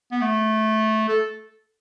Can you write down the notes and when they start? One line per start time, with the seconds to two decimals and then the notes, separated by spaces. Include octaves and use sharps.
0.11 B3
0.22 A3
1.08 A4